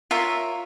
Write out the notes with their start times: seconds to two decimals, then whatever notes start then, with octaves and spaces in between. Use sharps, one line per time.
0.11 F4 A#4 C#5 E5